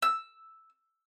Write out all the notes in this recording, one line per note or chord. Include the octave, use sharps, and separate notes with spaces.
E6